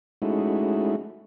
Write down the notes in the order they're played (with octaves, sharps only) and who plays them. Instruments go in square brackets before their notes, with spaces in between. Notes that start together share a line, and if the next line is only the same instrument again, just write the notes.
[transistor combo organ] G#3 A3 C#4 D#4 E4 F#4